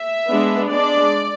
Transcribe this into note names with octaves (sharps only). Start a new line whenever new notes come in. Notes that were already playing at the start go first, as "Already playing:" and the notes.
Already playing: E5
G#3 B3 D4
G#3 D4 D5